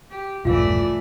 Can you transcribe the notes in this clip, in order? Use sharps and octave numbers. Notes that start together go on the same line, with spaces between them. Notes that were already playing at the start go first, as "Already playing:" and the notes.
G4
E1 A#1 G2 E3 A3 F4 D5 F5